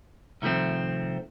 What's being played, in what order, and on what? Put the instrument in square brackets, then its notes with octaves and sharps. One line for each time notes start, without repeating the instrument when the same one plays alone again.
[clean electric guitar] C2 D#3 F3 A3 C4